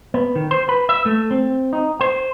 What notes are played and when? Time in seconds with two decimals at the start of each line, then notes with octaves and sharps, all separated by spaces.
0.14 B3
0.35 D#3
0.51 C5
0.69 B4
0.89 E5
1.06 A3
1.31 C4
1.73 D#4
2.01 C5